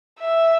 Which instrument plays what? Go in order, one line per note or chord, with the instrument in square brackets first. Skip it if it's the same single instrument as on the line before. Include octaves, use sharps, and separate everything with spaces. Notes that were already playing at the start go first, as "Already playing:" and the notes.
[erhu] E5